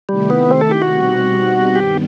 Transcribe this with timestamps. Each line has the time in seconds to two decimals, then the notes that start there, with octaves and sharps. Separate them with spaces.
0.09 C3 D#3 G3 A3 E4 G4
0.30 B3
0.51 C4
0.61 A4
0.71 G4
0.82 F#4
0.92 B2 G3 C4 D#4 G4
1.75 G2 D#3 G3 B3 G4